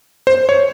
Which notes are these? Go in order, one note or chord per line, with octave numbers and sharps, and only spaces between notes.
C5
C#5